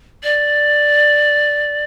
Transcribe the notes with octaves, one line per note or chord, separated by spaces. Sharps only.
D5